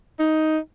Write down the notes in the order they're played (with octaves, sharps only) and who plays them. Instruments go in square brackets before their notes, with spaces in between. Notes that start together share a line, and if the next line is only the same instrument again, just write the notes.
[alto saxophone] D#4